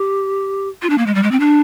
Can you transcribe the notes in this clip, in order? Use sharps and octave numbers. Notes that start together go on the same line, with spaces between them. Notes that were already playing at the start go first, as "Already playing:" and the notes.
Already playing: G4
F4
D4
A#3
G#3
G3
G#3
C4
D4